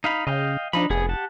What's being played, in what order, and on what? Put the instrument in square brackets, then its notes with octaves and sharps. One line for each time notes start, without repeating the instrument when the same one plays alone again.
[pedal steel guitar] D#4 F5 B5
[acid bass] C#3 [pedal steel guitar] D#5 F5 G5
[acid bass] F3 [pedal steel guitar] D4 D#4 B5
[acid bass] F1 [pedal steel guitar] B3 G#4
[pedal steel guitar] G4 F#5 A5